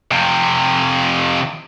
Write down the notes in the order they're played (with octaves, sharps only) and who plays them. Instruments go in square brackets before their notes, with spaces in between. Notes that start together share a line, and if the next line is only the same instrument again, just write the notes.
[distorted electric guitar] F2 C3